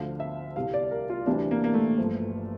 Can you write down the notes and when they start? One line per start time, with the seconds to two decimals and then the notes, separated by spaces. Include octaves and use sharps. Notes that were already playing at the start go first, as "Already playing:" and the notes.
Already playing: D2 D3 F3 F5
0.20 E5
0.56 C2 C3 G3 F5
0.74 D5
0.91 A#4
1.10 F4
1.26 D2 C3 E3 G3 D4
1.51 A#3
1.64 A#3
1.74 A3
1.98 G1 G2 F3